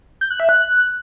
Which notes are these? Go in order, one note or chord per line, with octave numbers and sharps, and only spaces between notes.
G6
F#6
E5
F#6